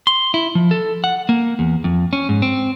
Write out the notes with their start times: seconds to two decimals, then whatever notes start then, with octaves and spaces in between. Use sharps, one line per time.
0.07 C6
0.34 E4
0.55 F3
0.71 A4
1.04 F#5
1.29 A#3
1.59 E2
1.84 F2
2.13 C#4
2.29 G#2
2.42 C4